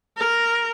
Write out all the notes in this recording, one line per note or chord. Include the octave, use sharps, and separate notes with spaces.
A#4